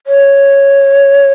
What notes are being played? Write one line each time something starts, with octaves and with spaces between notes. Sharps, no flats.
C#5